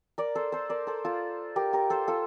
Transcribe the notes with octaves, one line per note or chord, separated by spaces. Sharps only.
A#4 D5
A4 C5
A4 C5
A#4 D5
A4 C5
F4 A4
G4 A#4
G4 A#4
A4 C5
F4 A4